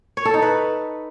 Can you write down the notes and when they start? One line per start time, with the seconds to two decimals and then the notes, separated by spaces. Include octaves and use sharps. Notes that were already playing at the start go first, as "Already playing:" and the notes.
0.17 C#5
0.25 A4
0.34 D#4
0.42 B4